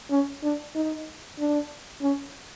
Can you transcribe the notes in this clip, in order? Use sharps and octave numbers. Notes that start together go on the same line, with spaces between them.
C#4
D4
D#4
D4
C#4